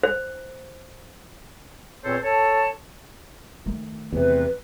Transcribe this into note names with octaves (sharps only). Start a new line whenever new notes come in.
C5
E2 A#2 C4 A4 C5 C#5
A4 C#5 A5
D#3 A3
E2 C3 B4